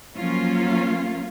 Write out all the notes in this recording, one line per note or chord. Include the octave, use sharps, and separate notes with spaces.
F3 F#3 A#3 C#4 F4